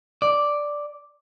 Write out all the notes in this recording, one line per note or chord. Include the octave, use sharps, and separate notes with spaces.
D5